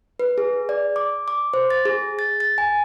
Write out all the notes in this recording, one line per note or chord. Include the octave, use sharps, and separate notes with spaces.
B4
G#4
D5
D6
D6
C5
A6
G#4
A6
A6
G#5